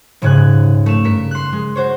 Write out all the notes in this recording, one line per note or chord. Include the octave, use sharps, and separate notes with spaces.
D#1 G#2 C#3 G#5 F#6
A3 E7
G2 A#4 B6 C#7
C6 F#6
G#3
F#4 C5 C#5